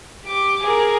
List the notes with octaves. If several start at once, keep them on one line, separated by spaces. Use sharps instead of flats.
G4 D6
G#4 A#4